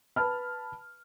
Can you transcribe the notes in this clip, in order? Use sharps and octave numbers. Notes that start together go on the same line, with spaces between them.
B4 A5 B5 F6